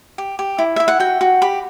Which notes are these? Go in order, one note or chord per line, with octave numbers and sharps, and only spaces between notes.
G4
G4
E4
E4 E5
F#5
F#4 G5
F#4
G4 B5